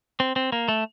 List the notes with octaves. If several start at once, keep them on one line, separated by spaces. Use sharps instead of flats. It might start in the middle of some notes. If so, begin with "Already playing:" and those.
C4
C4
A#3
A3